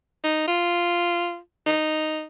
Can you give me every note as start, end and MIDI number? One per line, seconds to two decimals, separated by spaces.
0.24 0.45 63
0.48 1.38 65
1.66 2.24 63